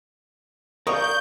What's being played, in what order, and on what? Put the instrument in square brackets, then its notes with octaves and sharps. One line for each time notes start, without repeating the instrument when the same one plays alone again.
[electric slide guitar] A#4 D5 F5 [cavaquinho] C#6 D#6 [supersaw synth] G6